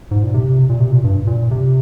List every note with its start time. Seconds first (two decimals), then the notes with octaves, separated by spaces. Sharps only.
0.11 G#2
0.23 A#2
0.34 C3
0.69 A#2
0.80 C3
0.91 A#2
1.04 G2
1.27 A#2
1.51 C3